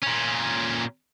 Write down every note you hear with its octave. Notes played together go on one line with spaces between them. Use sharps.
A#2 C#4